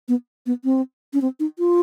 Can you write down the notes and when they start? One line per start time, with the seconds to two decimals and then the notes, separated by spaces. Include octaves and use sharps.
0.08 B3
0.46 B3
0.64 C4
1.14 C#4
1.22 C4
1.40 D#4
1.59 F4